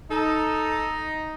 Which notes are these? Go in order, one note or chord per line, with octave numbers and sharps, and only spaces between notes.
D#4 A4